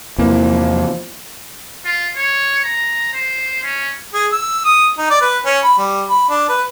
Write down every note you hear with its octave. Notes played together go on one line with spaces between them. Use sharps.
E2 C3 E3 F3 A#3
F4
C#5
A#5
C5
C#4
G#4
E6
D#6
D#4
D5
B4
C#4
B5
G3
B5
D4
B4